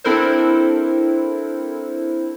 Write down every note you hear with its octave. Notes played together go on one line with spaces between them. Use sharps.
C4 D4 E4 A4 A#4 C5